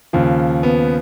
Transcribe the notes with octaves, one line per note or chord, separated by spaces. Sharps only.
D#2 C#3 F3
B3